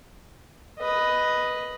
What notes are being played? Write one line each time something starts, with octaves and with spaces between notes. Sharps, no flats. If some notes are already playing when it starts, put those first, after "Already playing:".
B4 D#5